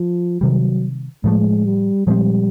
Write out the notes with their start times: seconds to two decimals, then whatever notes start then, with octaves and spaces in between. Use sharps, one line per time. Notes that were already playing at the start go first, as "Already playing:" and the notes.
Already playing: F3
0.41 C3 D#3 F#3 G3
1.24 A2 F3 G#3 A3
1.65 G3
2.06 A#2 F3 G3 G#3 C4